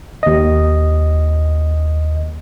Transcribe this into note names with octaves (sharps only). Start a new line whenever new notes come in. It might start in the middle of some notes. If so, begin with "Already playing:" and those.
D#2 D#5